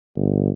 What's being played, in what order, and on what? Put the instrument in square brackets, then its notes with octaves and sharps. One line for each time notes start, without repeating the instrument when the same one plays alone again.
[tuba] G1